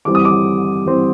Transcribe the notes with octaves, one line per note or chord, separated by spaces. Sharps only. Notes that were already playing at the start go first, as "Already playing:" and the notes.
E3 G3 C4 D6
D#6
D6
E3 G3 C4